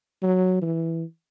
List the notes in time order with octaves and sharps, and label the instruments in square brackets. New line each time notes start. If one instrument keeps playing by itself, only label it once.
[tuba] F#3
E3